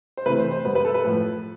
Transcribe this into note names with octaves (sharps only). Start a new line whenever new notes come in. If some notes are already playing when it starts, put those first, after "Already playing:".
C5
C3 E3 A3 B4
C5
C5
B2 G3 B3 B4
B4
A4
B4
A2 F3 A3